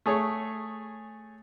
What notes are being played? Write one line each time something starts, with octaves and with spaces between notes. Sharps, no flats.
A3 G#4 C#5